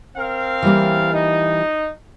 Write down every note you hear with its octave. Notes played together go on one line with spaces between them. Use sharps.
C4 A#4 F5
E3 G3 A#3
D#4